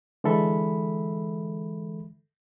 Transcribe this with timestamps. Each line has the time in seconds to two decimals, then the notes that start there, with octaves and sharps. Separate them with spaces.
0.24 D3 E3 G#3 A4 E5 B5